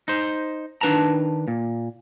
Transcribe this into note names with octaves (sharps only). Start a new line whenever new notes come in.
D#4 C5
D#3 D4 B4 A5 A#5
A#2